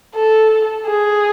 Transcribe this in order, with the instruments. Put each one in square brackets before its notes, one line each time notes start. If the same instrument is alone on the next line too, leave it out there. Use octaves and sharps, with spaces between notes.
[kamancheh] A4
G#4